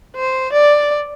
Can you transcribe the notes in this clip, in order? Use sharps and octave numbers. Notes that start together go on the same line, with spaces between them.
C5
D5